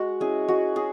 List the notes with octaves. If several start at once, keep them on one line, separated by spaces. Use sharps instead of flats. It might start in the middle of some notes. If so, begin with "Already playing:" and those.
Already playing: G#3 F#4
C#4 E4 G#4
G#3 F#4
C#4 G#4